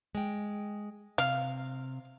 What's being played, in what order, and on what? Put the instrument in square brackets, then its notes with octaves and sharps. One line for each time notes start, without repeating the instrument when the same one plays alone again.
[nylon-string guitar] G#3 G5
[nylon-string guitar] C3 [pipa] F5